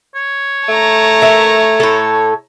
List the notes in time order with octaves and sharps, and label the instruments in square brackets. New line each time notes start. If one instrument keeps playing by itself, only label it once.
[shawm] C#5
[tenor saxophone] A3 [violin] A5 A#5
[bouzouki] A#4 E5
A2 A4